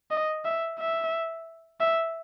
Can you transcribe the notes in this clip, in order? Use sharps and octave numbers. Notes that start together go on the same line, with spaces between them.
D#5
E5
E5
E5